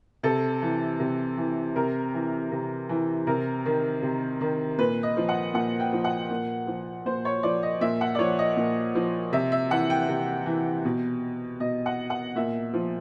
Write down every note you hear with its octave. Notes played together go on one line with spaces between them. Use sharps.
C3 A4
E3
C3
E3
C3 A#4
E3
C3
E3
C3 A#4
D#3
C3
D#3
A#2 B4
D#5
F3
F#5
A#2 F#5
G5
F3
F#5
A#2
F3
A#2 C5
C#5
F3 D5
D#5
A#2 E5
F#5
D5
F3 C#5
D#5
A#2
F3
C3 E5
E5
E3 F#5
G5
C3
E3
B2
B2 D#5
F#5
F#5
A#2 E5
F3